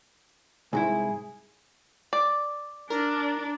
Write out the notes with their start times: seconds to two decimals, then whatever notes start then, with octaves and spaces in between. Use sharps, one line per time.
0.73 C2 G#2 E4 G#4
2.13 D5
2.90 D4 A#4